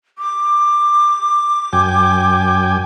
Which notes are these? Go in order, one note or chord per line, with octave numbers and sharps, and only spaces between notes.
D6
F#2 G5 G#5